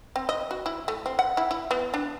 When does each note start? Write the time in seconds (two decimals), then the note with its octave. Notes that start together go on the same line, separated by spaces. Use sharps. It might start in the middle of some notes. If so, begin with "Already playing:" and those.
0.16 C4
0.29 D#5
0.51 F#4
0.66 E4
0.88 A3
1.06 C4
1.19 F#5
1.37 E4
1.51 E4
1.71 B3
1.94 D4